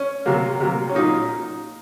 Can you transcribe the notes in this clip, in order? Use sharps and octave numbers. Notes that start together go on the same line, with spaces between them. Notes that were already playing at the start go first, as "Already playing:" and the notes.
Already playing: C#4
C3 F#3 A#3
C3 F#3 A#3
C#4
A#2 F#3 A#3 D#4